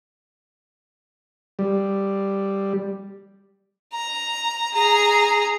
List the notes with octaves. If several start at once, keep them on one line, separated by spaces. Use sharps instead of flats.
G3
A#5
G#4 A#5